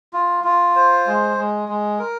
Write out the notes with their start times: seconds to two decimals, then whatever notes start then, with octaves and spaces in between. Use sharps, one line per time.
0.13 F4
0.44 F4
0.76 C5
1.07 G#3
1.37 G#3
1.69 G#3
1.99 A#4